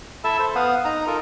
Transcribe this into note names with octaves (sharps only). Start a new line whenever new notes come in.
E4 A4 E5 A5 E6
A4 C5
B3 F5 F#5 D#6
D#4 A#5 D#6
F4 A4 A#4